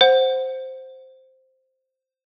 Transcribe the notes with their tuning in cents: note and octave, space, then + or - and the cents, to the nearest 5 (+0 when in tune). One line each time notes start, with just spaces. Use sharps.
C5 +0 F#5 +0